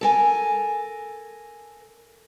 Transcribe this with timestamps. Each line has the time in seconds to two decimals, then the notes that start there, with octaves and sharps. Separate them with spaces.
0.01 A4 A#4 G#5